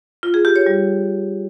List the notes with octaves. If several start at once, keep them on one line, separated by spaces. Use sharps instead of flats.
F4
G#4
G4
C#5
G3